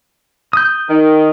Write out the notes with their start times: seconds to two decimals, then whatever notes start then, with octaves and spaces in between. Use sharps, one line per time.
0.53 D#6 G6
0.89 D#3